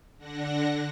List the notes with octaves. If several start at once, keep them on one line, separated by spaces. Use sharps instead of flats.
D3 D4 F#5 A#6